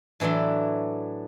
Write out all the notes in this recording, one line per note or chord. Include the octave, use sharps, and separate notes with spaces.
A2 E3 F#3 D4 C6